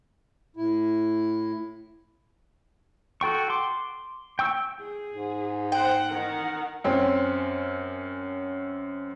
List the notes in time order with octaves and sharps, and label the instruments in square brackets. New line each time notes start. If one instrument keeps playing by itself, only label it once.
[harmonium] A2 E4
[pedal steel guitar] F#4 A4 G5 C#6
C6 D6
G5 C#6 E6
[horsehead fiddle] G#4
[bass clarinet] G#2
[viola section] C5 F#5 [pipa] G5
[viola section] D#3 [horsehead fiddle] A#4 F#5
[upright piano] F#2 C4 C#4